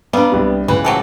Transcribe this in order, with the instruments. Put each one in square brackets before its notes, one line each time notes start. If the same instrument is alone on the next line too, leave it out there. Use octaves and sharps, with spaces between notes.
[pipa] G3 [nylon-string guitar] B3 D4 [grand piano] F5 A#5
[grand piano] C2 C3
[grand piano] C#2 A2 [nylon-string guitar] E3 [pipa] B4
[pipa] F#3 G4 A4